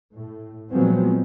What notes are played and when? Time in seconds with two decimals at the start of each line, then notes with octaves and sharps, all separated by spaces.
0.13 A2
0.71 A#2 F3 F#3 G#3 B3 C4